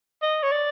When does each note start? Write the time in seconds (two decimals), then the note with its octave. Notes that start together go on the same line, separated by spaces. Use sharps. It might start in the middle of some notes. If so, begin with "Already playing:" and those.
0.22 D#5
0.43 C#5
0.52 D5